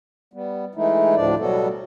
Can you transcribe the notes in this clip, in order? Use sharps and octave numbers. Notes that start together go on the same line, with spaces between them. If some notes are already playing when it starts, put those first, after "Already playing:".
G3 B3
E3 G#3 A3 D#4 E4
D2 A2 F3 D4 D5
B2 F#3 G3 B3 F#4 A4